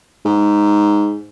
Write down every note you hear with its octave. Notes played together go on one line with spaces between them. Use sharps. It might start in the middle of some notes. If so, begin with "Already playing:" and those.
G#2